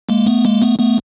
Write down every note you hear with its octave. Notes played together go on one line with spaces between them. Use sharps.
G#3 A#3
A3 B3
G#3 A#3
A3 B3
A3 B3